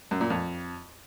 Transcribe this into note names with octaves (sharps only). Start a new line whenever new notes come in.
F#2
A#2
F2